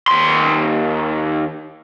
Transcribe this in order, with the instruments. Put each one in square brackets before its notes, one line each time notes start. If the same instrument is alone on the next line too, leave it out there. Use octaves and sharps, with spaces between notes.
[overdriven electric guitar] D#2 C6